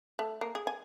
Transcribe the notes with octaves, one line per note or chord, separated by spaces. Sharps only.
A3
A#3
G#4
G#5